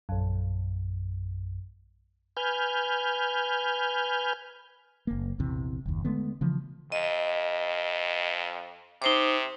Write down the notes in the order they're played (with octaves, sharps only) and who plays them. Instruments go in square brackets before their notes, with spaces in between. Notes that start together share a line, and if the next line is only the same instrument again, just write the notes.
[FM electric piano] A#1 F#2
[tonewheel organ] B4 G#5 F6 G6
[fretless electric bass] F#1 A#3
A#1 E2 C3 E3
F#1 D#2
D3 G#3 A3 B3
C#3 E3 F3
[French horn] F2 [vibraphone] D#5
[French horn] C3 [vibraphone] D#4 C5 D6